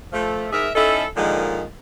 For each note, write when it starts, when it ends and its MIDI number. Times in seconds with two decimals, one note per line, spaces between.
0.13 0.48 53
0.13 0.48 57
0.52 0.70 44
0.52 0.70 68
0.52 0.70 70
0.52 0.70 76
0.75 1.04 61
0.75 1.04 63
0.75 1.04 64
0.75 1.04 69
1.17 1.63 46
1.17 1.63 50
1.17 1.63 51
1.17 1.63 53
1.17 1.63 56